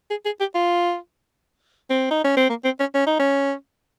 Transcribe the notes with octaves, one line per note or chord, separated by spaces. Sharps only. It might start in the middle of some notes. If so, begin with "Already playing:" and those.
G#4
G#4
G4
F4
C4
D#4
C#4
C4
A#3
C4
C#4
C#4
D#4
C#4